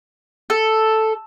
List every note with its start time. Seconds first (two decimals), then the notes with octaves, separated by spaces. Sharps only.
0.50 A4